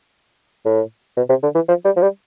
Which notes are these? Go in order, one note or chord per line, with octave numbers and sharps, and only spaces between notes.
A2
B2
C3
D3
E3
F3
G3
F3
G3